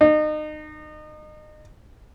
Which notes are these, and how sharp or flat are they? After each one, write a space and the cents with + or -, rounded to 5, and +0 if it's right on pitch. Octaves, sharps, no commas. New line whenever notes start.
D#4 -30